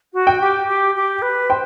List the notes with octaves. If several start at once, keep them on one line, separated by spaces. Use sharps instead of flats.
F#4
G5
G4
G4
G4
B4
C5 G5